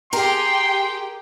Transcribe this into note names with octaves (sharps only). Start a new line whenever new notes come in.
G4 G#4 A#4 G5 A#5 C6